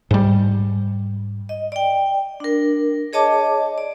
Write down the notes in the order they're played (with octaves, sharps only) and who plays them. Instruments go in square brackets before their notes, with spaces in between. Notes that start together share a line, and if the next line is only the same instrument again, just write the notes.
[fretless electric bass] G#2 G3
[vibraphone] D#5
D5 G5
D4 A#4
G#4 C#5 D#5 A5 D6
D5